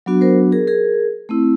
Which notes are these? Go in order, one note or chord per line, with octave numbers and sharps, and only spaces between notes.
F#3 B3 D4 F#4
A#4 C5
G#4 A#4
G#4 A#4
A3 C4 E4